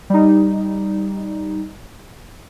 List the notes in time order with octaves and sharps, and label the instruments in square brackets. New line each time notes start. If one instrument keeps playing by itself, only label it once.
[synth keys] G3 D#4